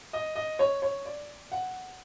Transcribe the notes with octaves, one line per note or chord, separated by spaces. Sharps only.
D#5
D#5
C#5
C#5
D5
F#5